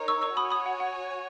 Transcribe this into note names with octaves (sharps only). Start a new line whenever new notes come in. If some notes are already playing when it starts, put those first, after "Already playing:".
Already playing: D#4 A#4 C#5
C#6 E6
C#6 E6
F#4 C#5 G#5 B5 D#6
B5 D#6
F#5
F#5